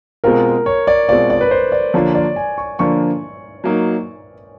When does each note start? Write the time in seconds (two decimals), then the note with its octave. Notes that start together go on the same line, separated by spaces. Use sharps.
0.24 B2 G#3 C4 F4 A#4
0.66 C#5
0.87 D5
1.08 B2 G#3 C4 F4 D5
1.30 D5
1.41 B4
1.51 C5
1.72 D5
1.94 D3 F3 A#3 D4 F4 C#5
2.15 D5
2.36 G#5
2.58 C#6
2.79 D3 F3 A#3 D4 F4 C#6
3.64 F#3 A#3 D#4